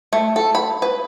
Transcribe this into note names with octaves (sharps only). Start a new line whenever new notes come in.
A3
A4
B5
B4